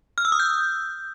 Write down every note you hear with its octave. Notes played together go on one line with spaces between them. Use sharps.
F6
E6
D#6
G6